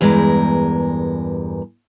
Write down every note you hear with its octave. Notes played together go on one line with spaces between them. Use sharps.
E2 G2 G#3 A#4